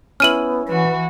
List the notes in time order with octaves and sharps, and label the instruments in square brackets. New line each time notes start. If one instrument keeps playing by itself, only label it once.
[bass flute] B3 [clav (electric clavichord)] C#4 E4 [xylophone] F6 D#7 F#7
[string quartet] E3 F#4 [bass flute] B4